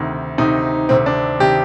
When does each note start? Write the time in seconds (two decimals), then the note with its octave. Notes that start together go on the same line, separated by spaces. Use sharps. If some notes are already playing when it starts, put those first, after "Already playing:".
Already playing: D2 C3 D#3
0.38 D2 C3 D#3 D#4
0.89 D2 C3 D#3 C4
1.06 D4
1.40 C3 D#3 G4